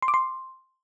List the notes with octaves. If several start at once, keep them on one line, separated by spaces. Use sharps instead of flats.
C6
D6
C6